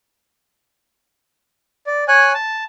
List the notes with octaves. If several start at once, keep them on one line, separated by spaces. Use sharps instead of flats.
D5
C#5 G#5 F#6
A5